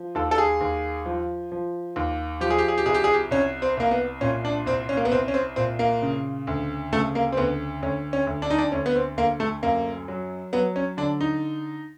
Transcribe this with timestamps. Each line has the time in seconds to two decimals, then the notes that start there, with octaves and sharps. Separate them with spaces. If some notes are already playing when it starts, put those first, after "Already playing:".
Already playing: F3
0.15 D#2 A4
0.31 A4
0.38 G#4
0.61 D#2
1.06 F3
1.52 F3
1.96 D#2
2.41 F3 G4
2.50 G#4
2.58 G4
2.68 G#4
2.78 G4
2.86 C2 G#4
2.94 G4
3.04 G#4
3.13 G4
3.31 C2 C#4
3.62 C4
3.77 C2 A#3
3.91 B3
4.21 A#2 C#4
4.45 D4
4.66 C2 C4
4.89 C#4
4.97 A#3
5.05 B3
5.11 C2 C4
5.28 C#4
5.34 C4
5.56 A#2 C4
5.79 A#3
6.02 C#3
6.47 D2
6.92 C#3 A3
7.15 A#3
7.32 C4
7.37 D2 B3
7.82 D2 C#4
8.13 C#4
8.27 D2
8.42 D4
8.51 D#4
8.58 D4
8.72 D2 C#4
8.86 B3
8.96 C4
9.17 D2 A#3
9.40 A3
9.63 F#2 A#3
10.08 F#3
10.53 F#3 B3
10.76 C#4
10.97 D3 D4
11.21 D#4